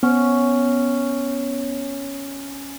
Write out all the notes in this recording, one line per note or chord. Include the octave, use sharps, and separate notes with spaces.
B3 C#4